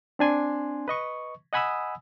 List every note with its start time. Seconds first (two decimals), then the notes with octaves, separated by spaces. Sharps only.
0.19 C4 D4 G#5 C6
0.88 B4 D#5 C#6
1.53 D#5 F#5 G#5 B5 D#6 E6